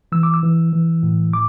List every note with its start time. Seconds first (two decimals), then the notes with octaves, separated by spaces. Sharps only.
0.12 E3 E6
0.23 D6
0.34 E6
0.43 E3
0.73 E3
1.03 A2
1.34 D6